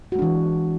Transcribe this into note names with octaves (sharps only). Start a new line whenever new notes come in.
E3 G#3 D4 F#4